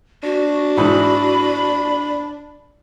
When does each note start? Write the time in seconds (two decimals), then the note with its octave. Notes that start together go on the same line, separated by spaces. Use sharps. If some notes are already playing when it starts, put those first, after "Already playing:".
0.24 D4 F#4
0.77 G#2 E3 B5